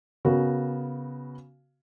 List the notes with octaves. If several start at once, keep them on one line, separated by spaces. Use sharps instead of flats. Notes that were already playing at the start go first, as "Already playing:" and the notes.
C#3 B3 F#4 A#4